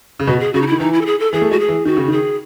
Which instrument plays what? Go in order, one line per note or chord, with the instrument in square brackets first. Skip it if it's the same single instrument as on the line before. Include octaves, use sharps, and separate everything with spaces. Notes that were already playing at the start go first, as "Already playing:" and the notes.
[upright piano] C#3
[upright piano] B2 [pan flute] F#4
[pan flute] G#4
[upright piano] C#3 [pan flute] F#4
[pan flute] D#4
[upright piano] D#3 [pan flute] E4
[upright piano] E3 [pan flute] D#4
[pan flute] E4
A4
G#4
A4
[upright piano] E3 [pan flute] G#4
[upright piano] A3
[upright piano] G#3 [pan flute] F#4
[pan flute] G#4
[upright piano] E3
[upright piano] D#3 [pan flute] F#4
[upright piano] C#3
[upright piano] D#3 [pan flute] G#4